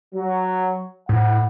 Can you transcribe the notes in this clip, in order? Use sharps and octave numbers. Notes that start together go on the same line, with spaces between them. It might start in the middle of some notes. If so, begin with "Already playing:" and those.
F#3
A2 F#5